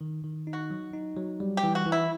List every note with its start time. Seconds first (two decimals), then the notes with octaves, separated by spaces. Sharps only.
0.01 D#3
0.24 D#3
0.47 D#4
0.53 F#4
0.71 F#3
0.93 D#4
1.17 F#3
1.40 G3
1.57 G4
1.64 E3
1.75 F#4
1.86 E3
1.92 E4